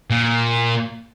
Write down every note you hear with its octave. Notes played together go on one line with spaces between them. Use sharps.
A#2